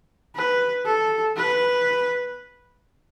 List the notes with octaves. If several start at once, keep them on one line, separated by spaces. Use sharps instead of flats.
B4
A4
B4